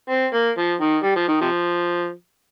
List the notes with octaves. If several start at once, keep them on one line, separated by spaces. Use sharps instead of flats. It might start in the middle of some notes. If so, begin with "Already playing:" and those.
C4
A#3
F3
D#3
G3
F3
D#3
C3 F3